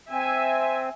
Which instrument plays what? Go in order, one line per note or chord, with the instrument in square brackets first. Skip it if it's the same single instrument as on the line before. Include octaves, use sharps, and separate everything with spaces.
[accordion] C4 [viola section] E5 G#5